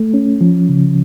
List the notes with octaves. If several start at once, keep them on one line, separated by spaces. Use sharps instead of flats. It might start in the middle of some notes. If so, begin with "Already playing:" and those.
Already playing: A3
C#4
F3
C#3